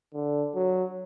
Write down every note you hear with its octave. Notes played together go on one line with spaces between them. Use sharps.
D3
F#3